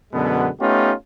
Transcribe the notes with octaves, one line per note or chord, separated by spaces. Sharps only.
F#2 B2 D3 G#3 B3
A3 B3 C#4 D#4 F4 G4